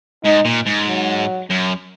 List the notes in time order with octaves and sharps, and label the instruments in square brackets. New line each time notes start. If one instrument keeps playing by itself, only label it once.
[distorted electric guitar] G#2 [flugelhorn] D#4
[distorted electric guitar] A#2
G#2
[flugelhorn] F#3
[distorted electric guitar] F#2